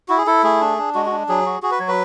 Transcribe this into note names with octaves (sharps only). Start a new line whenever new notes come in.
E4 F#4
G#4
E4 A4
A3 G#4
D4
D4
G#3 F#4
F#4
D4
F#3 G#4
F#4
F#4 G#4
B4
F#3 C#5
B4